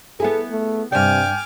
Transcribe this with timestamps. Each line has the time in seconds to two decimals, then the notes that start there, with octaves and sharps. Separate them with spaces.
0.20 B3 E4 G#4 A4
0.51 A3
0.92 G2 C3 D5 G5 G#5 D6 F6